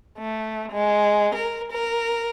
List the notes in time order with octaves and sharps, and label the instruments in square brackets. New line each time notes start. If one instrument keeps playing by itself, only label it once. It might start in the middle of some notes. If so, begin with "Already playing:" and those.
[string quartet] A3
G#3
A#4
A#4